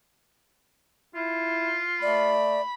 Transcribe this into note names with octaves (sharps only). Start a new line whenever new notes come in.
E4 F4
A3 D5 B5